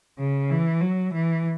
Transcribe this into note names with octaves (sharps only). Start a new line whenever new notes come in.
C#3
E3
F#3
E3